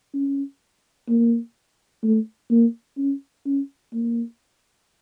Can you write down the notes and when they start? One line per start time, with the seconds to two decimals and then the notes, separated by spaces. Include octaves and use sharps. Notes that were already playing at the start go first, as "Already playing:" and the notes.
0.14 C#4
1.09 A#3
2.03 A3
2.51 A#3
2.98 C#4
3.46 C#4
3.93 A#3